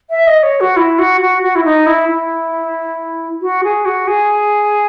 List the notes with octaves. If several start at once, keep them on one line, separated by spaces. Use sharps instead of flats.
E5
D#5
C#5
F#4
E4
F#4
F#4
F#4
E4
D#4
E4
E4
F#4
G#4
F#4
G#4